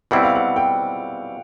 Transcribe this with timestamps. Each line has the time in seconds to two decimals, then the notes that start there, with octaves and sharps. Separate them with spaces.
0.11 B2 G3 C4 E4 F#5
0.23 F5
0.35 F#5
0.56 G5